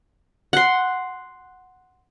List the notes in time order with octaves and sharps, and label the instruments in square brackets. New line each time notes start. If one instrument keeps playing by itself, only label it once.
[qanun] F#5 C6